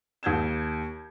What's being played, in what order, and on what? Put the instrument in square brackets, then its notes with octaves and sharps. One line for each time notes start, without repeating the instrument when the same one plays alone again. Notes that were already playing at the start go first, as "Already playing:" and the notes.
[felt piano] D#2 G6 G#6 E7